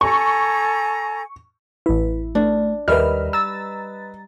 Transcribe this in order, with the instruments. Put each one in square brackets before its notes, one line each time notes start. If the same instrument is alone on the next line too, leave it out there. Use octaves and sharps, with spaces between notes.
[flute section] A4 G#5 A#5 [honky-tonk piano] C#6
[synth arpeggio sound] A1 E4 [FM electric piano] B4
[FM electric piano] A3 [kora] D4
[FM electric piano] D#2 A#4 E5 [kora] G3 [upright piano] B4 D#5 [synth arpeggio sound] F6
[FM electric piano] A#5 A6 [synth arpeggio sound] E6